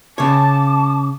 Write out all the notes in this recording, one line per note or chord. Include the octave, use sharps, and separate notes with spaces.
C#3 C#5 A5 D6